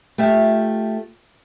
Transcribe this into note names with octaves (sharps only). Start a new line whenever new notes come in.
A3 F4 G4 E5